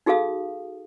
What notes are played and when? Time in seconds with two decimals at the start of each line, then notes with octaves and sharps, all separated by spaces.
0.06 D#4 F#4 G#4 A4 F5 D#6